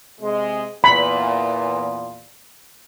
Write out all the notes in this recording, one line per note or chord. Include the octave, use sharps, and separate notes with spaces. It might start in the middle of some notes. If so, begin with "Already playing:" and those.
C3 G#3
E2 A#2 B5